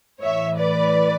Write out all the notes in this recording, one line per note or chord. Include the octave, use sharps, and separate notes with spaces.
A2 E3 C#5 E5
B4 D5